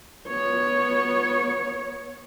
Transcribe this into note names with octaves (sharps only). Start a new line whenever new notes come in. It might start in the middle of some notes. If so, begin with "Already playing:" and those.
B3 C#5